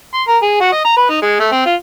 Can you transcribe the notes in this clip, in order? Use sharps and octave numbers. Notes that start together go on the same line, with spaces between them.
C6
A#4
G#4
F#4
D#5
A#5
B4
D#4
G#3
A3
C4
F4